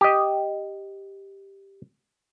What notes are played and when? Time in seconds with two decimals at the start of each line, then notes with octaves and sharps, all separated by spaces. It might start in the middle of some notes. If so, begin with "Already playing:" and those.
0.01 G4 D#5